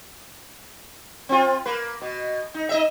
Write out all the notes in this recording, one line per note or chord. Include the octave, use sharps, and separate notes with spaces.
C4 F4
A#3 B4
B2
D#4
D#4 D#5 E5